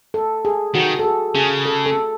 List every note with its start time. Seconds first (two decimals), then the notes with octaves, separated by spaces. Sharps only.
0.14 A4
0.45 G#4
0.75 D#3 F#4
0.99 A4
1.05 G#4
1.35 C#3 G#4
1.66 A4
1.86 A4